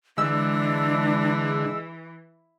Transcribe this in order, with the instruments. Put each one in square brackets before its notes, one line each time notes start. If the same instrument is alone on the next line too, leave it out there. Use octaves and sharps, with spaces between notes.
[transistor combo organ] D3 [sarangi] E3 [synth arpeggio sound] G#3 E6 [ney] D4